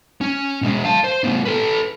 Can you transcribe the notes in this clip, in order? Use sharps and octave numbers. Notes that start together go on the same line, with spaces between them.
C#4
B2 G#3
F5 A5
C5
A2 B3
A4 B4